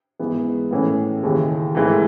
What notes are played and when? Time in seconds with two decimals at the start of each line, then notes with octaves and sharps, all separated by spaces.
0.19 G#2 E3 B3
0.71 A2 E3 A3 C#4
1.23 D#2 C#3 E3
1.75 G#2 E3 A3